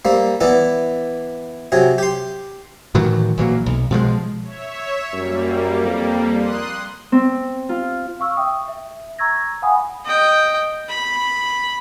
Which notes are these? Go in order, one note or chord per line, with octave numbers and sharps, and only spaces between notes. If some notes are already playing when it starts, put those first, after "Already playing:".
G3 A#3 C4
E3 B3 E4 D5
C3 F#3 G#4
G4 C6
A2 D#3 E3 F#3
A#1 E3 F#3 A#3
B1
B2 F3 F#3 G#3
C#5 E5
F#2 G3 A#3
F2
C6 D#6 F#6
C4
F4
F5 C#6 E6 F6
E5 G5 D#6
E5
A#5 C#6 E6 G#6 A#6
F5 F#5 G#5 B5 D#6
D#5 G5
B5